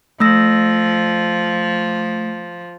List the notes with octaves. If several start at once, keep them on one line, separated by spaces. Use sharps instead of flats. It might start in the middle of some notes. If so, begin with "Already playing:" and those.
F3 A3 E6 A#6